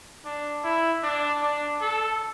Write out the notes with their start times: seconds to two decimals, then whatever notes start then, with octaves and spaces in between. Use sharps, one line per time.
0.25 D4
0.64 E4
1.03 D4
1.42 D4
1.81 A4